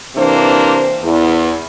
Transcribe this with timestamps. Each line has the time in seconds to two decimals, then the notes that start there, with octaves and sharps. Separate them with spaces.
0.16 C3 E3 A#3 D4 C5
1.01 E2